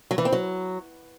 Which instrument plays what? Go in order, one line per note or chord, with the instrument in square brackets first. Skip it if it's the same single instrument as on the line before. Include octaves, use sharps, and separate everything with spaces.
[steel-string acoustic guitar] F#3
E3
C4
F#3